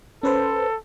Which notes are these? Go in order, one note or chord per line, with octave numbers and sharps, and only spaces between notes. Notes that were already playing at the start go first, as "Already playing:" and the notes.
C#4 A4 B4 C5